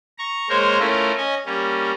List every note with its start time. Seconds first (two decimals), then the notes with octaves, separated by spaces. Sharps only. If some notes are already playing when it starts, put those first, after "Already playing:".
0.18 A#5 C#6
0.49 G#3 A#3 A#4 C5 C#5
0.79 A3 C#4 E4 F4 A#4
1.18 C#4 D#5 G#5
1.46 G3 A#3 C#4